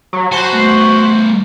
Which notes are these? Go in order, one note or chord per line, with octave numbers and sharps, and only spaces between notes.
F#3
F#4 C5 G#5 A5 B5
A3 B3